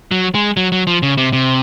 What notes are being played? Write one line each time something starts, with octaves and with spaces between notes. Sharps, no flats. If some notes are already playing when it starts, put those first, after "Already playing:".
F#3
G#3
F#3
F#3
F3
C#3
C3
C3